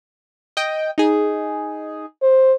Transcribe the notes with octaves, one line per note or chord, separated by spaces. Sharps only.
D#5 G5
D#4 G#4
C5